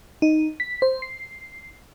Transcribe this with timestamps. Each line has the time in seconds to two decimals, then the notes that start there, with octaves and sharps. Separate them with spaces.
0.22 D#4
0.60 B6
0.82 C5
1.02 C7